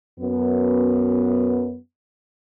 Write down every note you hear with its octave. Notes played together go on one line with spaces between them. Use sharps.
F#2 B3